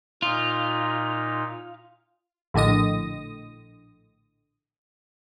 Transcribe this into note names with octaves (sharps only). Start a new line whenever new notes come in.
A#2 D#4 F4
A#1 A2 D3 D#5 D#6